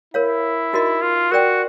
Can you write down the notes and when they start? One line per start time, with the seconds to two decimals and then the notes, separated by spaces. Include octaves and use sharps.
0.14 E4 A#4 C#5 F5
0.73 D#4 F#4 A#4 D#5
1.02 F4
1.31 F#4 A#4 D5 G5